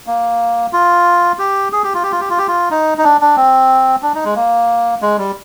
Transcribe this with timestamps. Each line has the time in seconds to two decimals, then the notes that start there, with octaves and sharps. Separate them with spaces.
0.07 A#3
0.73 F4
1.39 G4
1.73 G#4
1.84 G4
1.94 F4
2.03 G4
2.12 F4
2.20 G4
2.30 F4
2.38 G4
2.48 F4
2.71 D#4
2.98 D#4
3.04 D4
3.21 D4
3.36 C4
4.03 D4
4.15 D#4
4.24 G#3
4.36 A#3
5.02 G#3
5.18 G3